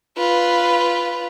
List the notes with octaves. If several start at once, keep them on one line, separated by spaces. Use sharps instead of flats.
F4 B4